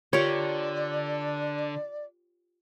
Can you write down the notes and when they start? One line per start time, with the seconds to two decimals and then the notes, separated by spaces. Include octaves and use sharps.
0.13 D3 F4 G4 A#4 C#5 D5